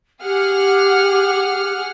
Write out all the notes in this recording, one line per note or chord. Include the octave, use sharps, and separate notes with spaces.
G4 G#4 F#5 F6